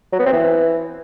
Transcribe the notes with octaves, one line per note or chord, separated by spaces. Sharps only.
F#3
B3
C4
E3